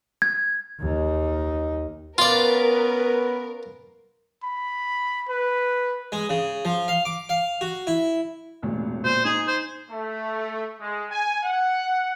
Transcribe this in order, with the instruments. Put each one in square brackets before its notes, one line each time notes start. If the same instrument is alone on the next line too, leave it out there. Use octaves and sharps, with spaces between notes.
[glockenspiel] G#6
[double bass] D#2 D#4
[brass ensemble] B3 C#4 B4 [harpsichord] F4 D5 [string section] A#4
[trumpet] B5
B4
[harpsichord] G#3
C#3
F3
F5
D6
F5
F#4
E4
[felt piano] E1 A1 A#2
[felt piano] A#2 [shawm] C5
[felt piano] D#4 [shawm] G#4
[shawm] C5
[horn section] A3
G#3
G#5
F#5